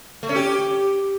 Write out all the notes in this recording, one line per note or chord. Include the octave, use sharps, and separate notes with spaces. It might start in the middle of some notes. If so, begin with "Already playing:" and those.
A3
C#4
G4